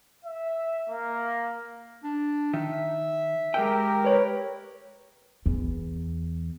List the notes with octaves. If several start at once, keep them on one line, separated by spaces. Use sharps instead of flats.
E5
A#3
D4
D#3 E5
G#3 G4 A#4 G5 E6
B4 C#5
E2